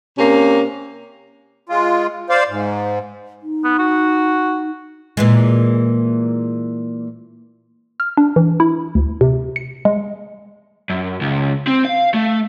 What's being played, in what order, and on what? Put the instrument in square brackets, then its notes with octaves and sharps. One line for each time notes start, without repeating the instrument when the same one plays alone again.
[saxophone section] C3 A#3 C#4
[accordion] G#3 F4
C5 D5 F5
G#2
[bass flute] D#4
[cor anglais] B3
F#4
[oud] A#2 E3 G#3
[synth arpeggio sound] F6
D4
E3
E4
D2
C3
C#7
G#3
[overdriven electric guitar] F#2
C#2
C4
F5
A3